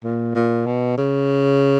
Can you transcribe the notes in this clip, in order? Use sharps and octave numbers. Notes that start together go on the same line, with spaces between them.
A#2
A#2
B2
C#3